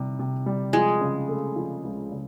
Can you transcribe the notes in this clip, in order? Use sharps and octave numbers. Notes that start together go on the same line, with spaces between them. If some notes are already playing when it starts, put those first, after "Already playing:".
Already playing: C3 G3
C3
G3
F3 G#3
C#3
A3
F3
C#2
C#3